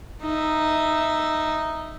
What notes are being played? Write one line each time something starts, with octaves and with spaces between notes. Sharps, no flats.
D#4 E5